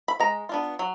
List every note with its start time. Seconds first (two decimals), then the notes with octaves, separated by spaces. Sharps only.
0.08 B5
0.20 G#3 A#5
0.49 B3 D4 F4
0.79 F#3